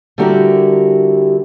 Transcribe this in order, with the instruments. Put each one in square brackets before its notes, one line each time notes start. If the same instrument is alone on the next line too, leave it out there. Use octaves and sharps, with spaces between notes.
[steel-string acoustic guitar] D3 G3 E4 F#4 G4 A#4